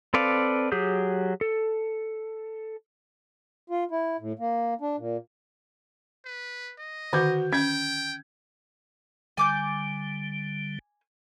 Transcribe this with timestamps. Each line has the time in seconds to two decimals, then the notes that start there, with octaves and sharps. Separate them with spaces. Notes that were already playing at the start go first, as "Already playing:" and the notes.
0.14 C4 A4 B4 D5 F5
0.72 F#3 G4 G#4 G6
1.41 A4
3.70 F4
3.91 E4
4.20 A2
4.39 A#3
4.81 D4
4.98 A#2
6.25 B4
6.79 D#5
7.13 D3 D#3 F#4 D6 G6
7.53 C#4 G5 G#6
9.37 D3 G3 G#5 D6 G6